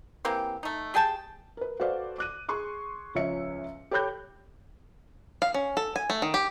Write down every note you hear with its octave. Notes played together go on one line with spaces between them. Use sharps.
E3 A#3 C4 G4
A3 D#4
G4 G#4 G5 A5
A#4 B4
F#4 A4 B4 C5 D5 F5
D6 F#6 D#7
G#4 C6 C#6 F#6
C#2 F3 C#4 E5 C#7
G4 A4 C#5 B5 F#6 G6
F5
C#4
A4
G#5
A3
D#3
G4